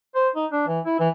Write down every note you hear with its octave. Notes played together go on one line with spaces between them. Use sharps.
C5
D#4
D4
E3
E4
E3